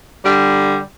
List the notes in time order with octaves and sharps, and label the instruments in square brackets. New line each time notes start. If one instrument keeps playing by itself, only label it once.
[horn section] D3 G3